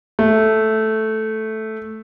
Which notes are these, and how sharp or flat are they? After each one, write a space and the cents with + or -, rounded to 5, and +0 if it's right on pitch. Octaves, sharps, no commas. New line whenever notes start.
A3 -5